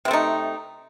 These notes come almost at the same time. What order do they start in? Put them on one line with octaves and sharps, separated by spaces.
C3 C4 A3 D#4